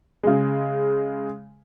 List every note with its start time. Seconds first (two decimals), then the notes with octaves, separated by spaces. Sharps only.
0.23 C#3 G#3